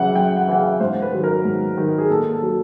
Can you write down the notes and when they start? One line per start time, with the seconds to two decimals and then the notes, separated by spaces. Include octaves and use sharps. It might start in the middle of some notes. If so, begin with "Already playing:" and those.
Already playing: F#2 C#3 E3 F#5
0.15 F#2 G5
0.37 F#5
0.48 C#3 E3 F#5
0.58 F5
0.80 G#2 C5
1.02 B4
1.13 D#3 F#3
1.24 A#4
1.45 G#2
1.77 D#3 F#3
1.98 G#4
2.10 A#2 A4
2.31 A4
2.43 F#3